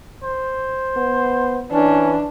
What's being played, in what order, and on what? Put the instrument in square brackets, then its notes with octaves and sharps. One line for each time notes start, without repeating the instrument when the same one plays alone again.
[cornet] C5
[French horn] B3
[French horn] E3 [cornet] C#4 [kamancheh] D4